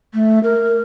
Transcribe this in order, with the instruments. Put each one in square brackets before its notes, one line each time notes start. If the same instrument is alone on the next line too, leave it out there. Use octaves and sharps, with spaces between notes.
[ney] A3
A#4